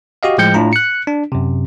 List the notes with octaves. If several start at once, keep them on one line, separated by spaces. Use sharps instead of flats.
F#4 G4 D#5 F5
A2 F3 G#3 G5 G6 C#7
A2 D4 F4 A#5
F#6 C#7
D4
F#2 C3